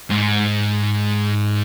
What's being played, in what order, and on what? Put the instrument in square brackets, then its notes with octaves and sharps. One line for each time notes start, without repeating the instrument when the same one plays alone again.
[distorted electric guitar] G#2